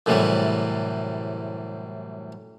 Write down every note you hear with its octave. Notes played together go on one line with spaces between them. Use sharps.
F#2 A2 C3 E3 G3